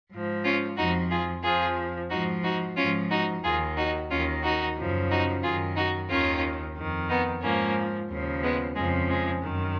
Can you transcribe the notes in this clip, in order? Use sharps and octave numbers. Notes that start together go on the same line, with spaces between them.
G#2
F3
C#4 F4
F2 F3 D#4 F#4
F4 G#4
F2 F3 F4 G#4
G#2 F3 D#4 F#4
D#4 F#4
G#2 F3 C#4 F4
D#4 F#4
D#2 D#3 F4 G#4
D#4 F#4
D#2 D#3 C#4 F4
D#4 F#4
F#2 C#3 F3
D#4 F#4
F#2 D#3 F4 G#4
D#4 F#4
D#2 D#3 C#4 F4
F2 D#3
B3 D#4
G#2 F3 A#3 C#4
D#2 C#3 F3
G#3 B3
F2 C#3 F3 G#3
G#3
F#2 D#3